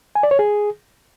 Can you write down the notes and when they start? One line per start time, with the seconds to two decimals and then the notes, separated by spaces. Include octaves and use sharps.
0.15 G#5
0.23 D5
0.31 C#5
0.39 G#4